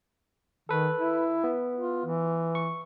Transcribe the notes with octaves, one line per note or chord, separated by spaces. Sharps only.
D#3 A4 B4
E4
B3
F4
E3
C#6